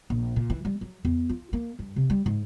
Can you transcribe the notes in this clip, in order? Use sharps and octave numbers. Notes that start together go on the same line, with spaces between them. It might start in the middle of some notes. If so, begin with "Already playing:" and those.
A#1
A#2
E3
G3
F#3
E2
F4
A#3
G2
C3
G3
G#2